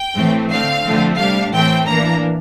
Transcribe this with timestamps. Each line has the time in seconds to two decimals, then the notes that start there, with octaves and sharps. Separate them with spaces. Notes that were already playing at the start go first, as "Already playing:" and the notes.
Already playing: G5
0.16 A2 E3 A3 C4
0.51 D3 A3 C4 F5
0.84 D3 F3 A3 C4
1.18 C3 G3 D4 F5
1.53 A2 E3 A3 C4 G5
1.87 E3 A#3 D4 A#5